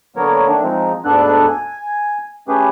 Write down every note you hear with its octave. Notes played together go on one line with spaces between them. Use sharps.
D3 F#3 A#3 B3 A#4 C#5
D#3 A3 D4
F3 G#3 C4 D#4
D2 G#2 B3 D4 A4 F#6
G#5
A3 C#4 G4 G#4 B4